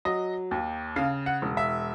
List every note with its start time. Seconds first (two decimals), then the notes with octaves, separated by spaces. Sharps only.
0.05 F#3 D#5
0.51 D#2
0.96 C#3 F5
1.26 F#5
1.42 E1
1.57 E5